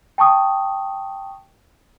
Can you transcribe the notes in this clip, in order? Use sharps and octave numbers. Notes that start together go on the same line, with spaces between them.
G5 A5 C#6 D#6